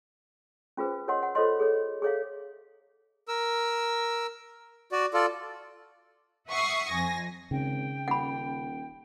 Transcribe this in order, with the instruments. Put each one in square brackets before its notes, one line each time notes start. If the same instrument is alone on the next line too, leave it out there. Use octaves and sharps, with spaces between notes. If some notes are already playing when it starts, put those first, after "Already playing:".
[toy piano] C#4 F4 G#4 B4 C5
F4 A#4 C#5 D#5 F#5 C6
F#5
F4 A4 C5 C#5 D#5 C6
G#4 A4 C#5
G#4 A4 C#5 E5 F5
[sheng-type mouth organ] A#4 E6
F#4 D5
F4 A4 D5
[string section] E5 F#5 C#6 D#6 C7
F2 G#5 A#6
[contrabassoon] G#1 [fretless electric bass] C#3 [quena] G5
[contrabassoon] D#1 [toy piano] F#5 B5